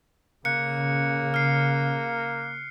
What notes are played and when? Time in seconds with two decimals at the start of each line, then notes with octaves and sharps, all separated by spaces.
0.45 C#3 A#3 F#6 C#7
1.34 F6 C7